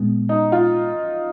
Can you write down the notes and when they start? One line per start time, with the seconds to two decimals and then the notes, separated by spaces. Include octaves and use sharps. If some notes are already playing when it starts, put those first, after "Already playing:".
Already playing: A#2 G#3 B3
0.29 D#4
0.52 F4